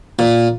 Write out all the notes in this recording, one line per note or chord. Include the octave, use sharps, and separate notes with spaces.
A#2